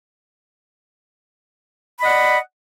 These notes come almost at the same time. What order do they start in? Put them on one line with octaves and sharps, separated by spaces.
B5 D#5 F#5 D5